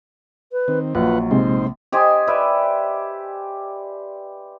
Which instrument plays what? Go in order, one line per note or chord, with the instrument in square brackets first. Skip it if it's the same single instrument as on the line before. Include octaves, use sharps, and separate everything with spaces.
[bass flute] B4
[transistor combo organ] D#3 C4
[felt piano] A#1 [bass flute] F#3 [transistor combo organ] F4 B4 F#5
[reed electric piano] C3 G#3 C4 [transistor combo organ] D#4 C5
[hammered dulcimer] G4 C5 D#5 G#5
B4 D5 E5